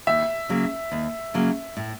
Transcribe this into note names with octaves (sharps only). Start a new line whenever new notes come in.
D#2 E5
C#3 F#3 A#3
D#2
C#3 F#3 A#3
A2